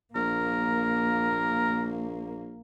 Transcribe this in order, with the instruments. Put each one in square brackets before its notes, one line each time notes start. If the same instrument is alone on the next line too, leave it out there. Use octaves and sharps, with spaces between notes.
[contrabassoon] A#1 [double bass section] A#3 [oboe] A#4